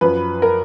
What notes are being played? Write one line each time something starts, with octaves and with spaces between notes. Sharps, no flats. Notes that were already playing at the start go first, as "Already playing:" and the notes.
F#2 F3 B4
A#4